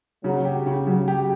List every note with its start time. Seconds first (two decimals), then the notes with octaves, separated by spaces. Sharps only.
0.24 C#3 F#3
0.45 G4
0.66 C#3
0.87 C#3 F#3
1.08 G4